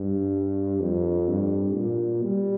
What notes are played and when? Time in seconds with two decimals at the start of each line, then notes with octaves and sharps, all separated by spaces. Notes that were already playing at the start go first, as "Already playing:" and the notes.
Already playing: G2
0.80 F2
1.28 G2
1.75 A#2
2.23 G3